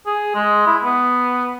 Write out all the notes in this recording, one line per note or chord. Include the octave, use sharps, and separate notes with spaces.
G#4
G#3
E4
B3